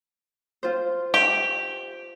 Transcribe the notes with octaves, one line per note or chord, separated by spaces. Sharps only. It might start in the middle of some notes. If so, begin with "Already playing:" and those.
F4 C5
G4